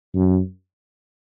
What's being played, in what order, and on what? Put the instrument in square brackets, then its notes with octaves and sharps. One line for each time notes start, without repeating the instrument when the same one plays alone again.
[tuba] F#2